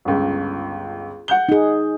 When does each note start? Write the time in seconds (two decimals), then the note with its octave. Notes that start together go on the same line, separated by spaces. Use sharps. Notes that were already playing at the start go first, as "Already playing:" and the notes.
0.05 G1 C#2
1.28 F#5 G6 G7
1.49 D#4 G#4